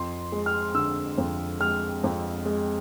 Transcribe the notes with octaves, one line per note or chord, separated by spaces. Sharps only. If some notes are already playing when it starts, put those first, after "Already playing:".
Already playing: F2 C6
G#3
F6
D3 E6
F2
G#3 F6
F2
G#3